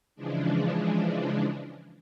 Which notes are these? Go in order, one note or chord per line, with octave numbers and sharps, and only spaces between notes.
C#3 E3 F3 G#3 D4